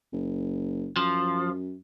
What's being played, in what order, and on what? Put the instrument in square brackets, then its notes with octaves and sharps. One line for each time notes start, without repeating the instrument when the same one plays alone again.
[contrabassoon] F#1
[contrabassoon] F#2 [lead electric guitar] F3